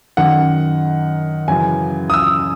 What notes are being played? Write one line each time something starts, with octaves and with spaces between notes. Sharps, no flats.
F#2 D#3 F#5
F#2 C#3 E3 G#5
D#6
E6